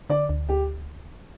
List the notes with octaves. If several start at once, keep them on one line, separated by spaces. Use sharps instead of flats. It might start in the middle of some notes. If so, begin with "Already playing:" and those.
D3 D5
D2
D2 G4